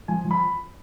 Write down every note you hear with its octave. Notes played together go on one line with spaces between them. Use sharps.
F3 G#5
F3
B5